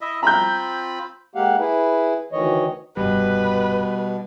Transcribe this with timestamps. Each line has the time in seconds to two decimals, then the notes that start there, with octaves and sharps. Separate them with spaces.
0.01 E4 D#5 E5
0.23 C4 F4 A#5 B5 G6
1.35 G#3 A#3 G4 F5 F#5
1.59 E4 G#4 B4
2.32 D2 D#3 E3 C#5 D#5
2.97 F1 G2 B2 G3 B4